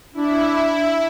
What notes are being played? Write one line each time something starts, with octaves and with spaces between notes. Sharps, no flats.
D4 E4